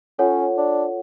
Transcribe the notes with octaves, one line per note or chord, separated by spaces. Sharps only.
C#4 F4 A4 C#5 F#5
D4